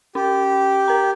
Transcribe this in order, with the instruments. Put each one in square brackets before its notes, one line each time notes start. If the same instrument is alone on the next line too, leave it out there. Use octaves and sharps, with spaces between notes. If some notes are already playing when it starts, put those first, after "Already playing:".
[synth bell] C#4 [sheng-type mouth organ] G4
[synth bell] A#4 A#5